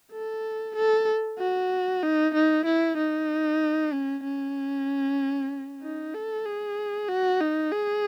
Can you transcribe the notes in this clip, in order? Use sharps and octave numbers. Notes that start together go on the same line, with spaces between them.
A4
A4
F#4
D#4
D#4
E4
D#4
C#4
C#4
D#4
A4
G#4
F#4
D#4
G#4